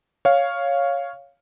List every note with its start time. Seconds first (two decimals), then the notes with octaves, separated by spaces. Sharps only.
0.25 C#5 F5